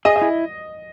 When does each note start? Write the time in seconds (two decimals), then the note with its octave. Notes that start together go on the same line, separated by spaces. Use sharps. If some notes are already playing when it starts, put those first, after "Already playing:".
0.05 G#4 D#5
0.16 D#5
0.22 E4